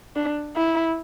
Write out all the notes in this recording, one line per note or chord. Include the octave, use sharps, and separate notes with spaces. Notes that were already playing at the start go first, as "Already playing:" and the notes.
D4
E4